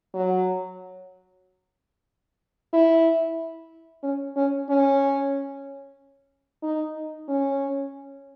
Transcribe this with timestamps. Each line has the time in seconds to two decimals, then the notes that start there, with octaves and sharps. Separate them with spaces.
0.15 F#3
2.74 E4
4.04 C#4
4.36 C#4
4.69 C#4
6.63 D#4
7.28 C#4